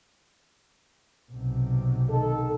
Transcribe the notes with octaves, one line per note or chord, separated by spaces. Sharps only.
B1 C3
D#3 A4